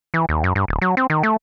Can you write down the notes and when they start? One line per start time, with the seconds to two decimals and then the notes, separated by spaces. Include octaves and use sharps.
0.14 E3
0.29 D#2
0.44 F#2
0.55 G2
0.68 D1
0.82 F#3
0.97 C4
1.10 D#3
1.23 A3